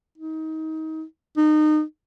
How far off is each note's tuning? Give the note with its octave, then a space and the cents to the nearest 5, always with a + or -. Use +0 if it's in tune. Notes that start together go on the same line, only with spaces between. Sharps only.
D#4 +25
D#4 -25